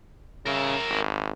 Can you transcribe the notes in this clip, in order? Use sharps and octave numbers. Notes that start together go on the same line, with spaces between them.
C#3 A#4 E5
G#1